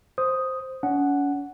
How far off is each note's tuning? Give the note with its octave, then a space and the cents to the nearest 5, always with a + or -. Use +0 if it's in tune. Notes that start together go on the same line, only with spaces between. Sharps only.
C5 +0 D#6 +0
C#4 +40 F#5 +0